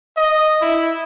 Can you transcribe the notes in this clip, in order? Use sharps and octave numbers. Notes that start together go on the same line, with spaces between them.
D#5
E4